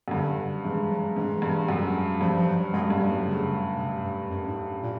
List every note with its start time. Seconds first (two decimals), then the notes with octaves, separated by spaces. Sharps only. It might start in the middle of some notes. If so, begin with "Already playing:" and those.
0.08 F#2
0.11 G2 D3
0.64 G#2 E3
0.90 F#3
1.16 G#2 E3
1.42 G2
1.69 F#2
2.21 G2 F3
2.37 F3
2.48 F#3
2.73 F#2 G#3
2.90 G2
3.00 G3
3.08 A2
3.26 C#3
3.78 C3
4.04 G2
4.30 F#2
4.48 G#2
4.83 A#2